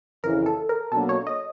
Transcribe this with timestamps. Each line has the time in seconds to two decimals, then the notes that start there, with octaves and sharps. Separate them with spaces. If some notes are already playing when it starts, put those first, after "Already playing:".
0.23 F2 C#3 E3 A#4
0.46 A4
0.69 A#4
0.92 B2 F#3 A#3 D4 F#4 A4
1.09 C#5
1.27 D#5